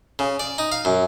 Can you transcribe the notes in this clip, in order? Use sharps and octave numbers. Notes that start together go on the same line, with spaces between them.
C#3
D5
D#4
F5
F#2